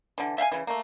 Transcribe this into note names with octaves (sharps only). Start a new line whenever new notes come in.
D3 E3
E5 F5 G5 G#5
C#3 E3
A3 A#3